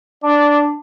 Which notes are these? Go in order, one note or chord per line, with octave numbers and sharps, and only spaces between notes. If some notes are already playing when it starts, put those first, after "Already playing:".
D4 D5